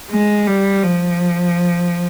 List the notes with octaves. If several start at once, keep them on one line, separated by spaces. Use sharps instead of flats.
G#3
G3
F3